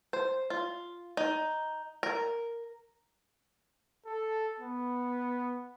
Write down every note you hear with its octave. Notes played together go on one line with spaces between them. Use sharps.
C5
F4
D#4
A#4
A4
B3